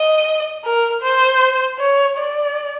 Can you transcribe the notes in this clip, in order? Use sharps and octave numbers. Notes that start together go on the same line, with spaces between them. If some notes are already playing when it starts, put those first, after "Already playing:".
Already playing: D#5
A#4
C5
C#5
D5